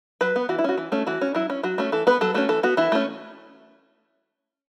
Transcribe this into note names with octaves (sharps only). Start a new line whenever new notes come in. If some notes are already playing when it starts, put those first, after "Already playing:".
F#3 B4
B3
E3 F#4
E4
C#4 F#4
E3
A3 C#4
E3 F#4
C#4
F#3 E4
C#4
F#3 F#4
A3 C#4
E3 A4
B3 B4
F#3 A4
A3 C#4 F#4
E3 A4
B3 F#4
E3 E4
A3 C#4